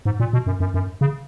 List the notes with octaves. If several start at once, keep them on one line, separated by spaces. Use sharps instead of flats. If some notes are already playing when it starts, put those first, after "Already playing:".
G#2
A#2
B2
F#2
F#2
F#2
C#3